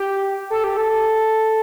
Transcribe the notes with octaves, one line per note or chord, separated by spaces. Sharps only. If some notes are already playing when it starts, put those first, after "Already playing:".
Already playing: G4
A4
G4
A4